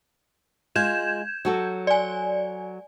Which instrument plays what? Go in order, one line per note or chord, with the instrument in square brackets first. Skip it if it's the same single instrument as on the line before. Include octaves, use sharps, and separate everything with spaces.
[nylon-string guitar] G#3 F4 [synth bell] G6 G#6 E7
[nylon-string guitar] F#3 F#4 A4
[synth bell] D5 G#5